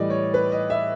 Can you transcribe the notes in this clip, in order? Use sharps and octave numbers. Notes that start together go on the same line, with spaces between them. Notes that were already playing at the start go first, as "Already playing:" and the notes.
Already playing: A2 E3 G3 D5 D#5
C#5
B4
D#5
E5